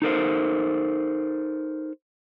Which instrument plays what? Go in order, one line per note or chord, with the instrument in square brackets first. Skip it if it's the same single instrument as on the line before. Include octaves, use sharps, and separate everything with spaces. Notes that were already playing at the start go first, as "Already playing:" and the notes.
[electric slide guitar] D#4 A4 A#4 C5